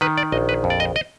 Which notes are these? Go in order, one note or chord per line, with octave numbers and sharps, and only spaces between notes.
D#3 B4
D5
A#1 D#5
B4
F2
D5
D#5
D#5